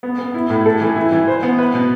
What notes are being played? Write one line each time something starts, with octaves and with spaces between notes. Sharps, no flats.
B3
B3
E4
A2
A4
E3
E4
E3
C5
B3
B4
B2